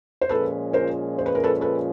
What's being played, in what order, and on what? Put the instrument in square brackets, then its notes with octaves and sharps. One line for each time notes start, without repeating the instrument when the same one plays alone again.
[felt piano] C5
[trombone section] A#2 F3 G#3 C#4 [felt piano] A4 B4
[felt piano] A#4 C5
C5
B4
A#4
A4 B4
A4 B4